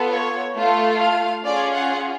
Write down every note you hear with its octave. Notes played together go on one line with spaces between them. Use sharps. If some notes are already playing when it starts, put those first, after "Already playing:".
Already playing: B3 F4 A4
C#5
A3 F4 A4
F5
C#4 F4 G#4 D5
F#5